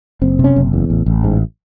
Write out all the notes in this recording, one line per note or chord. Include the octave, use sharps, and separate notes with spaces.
F#1 C4
C3
C#4
F#1
E2
A1
A1
G#2